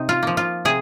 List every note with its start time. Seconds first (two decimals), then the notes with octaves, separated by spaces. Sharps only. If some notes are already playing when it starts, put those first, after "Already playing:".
Already playing: C3 D#4
0.09 F4
0.23 F3 A#3
0.37 F4
0.65 C3 G#4